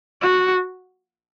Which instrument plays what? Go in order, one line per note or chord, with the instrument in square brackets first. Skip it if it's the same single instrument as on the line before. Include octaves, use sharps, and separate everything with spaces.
[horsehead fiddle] F#4